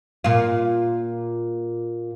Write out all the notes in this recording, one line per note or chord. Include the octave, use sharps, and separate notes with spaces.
A#2 F4